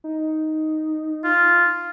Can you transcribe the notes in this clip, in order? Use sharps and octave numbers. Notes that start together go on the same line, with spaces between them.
D#4
F4